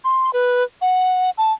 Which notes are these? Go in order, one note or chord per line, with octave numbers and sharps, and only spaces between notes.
C6
B4
F#5
A5